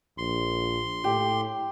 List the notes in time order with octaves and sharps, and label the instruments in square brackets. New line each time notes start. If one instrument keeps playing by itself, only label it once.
[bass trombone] A#1 [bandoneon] C6
[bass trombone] A2 [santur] G4